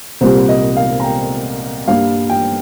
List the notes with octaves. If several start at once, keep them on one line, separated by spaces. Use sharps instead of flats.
C2 A#2 G3 C5
D#5
F5
A#5
G5
G2 G3 A#3 F5
G5